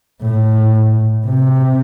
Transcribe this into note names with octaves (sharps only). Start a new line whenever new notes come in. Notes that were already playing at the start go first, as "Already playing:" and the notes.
A2
C3